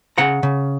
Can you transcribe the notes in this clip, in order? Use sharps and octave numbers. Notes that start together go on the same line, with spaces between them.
C#3 F#5 A#5
C#3